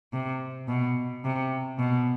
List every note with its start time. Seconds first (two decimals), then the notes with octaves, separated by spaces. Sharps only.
0.13 C3
0.68 B2
1.24 C3
1.79 B2